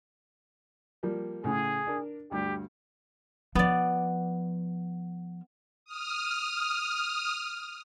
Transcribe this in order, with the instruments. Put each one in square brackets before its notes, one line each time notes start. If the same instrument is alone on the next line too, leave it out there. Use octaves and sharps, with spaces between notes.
[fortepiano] F3 G3 A#3
[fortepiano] A2 C#3 [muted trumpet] G#4
[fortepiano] D4 A#4
[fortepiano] D2 G2 [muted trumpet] G4
[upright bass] F3 [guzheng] B3 D5
[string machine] D#6 F6